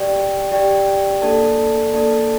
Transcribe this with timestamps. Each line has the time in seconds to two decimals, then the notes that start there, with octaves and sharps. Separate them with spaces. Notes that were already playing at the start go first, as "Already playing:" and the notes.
Already playing: G4 D5 G5
0.52 G4 D5 G5
1.22 A#3 D4 A4 D5 A5
1.93 A#3 D4 A4 D5 A5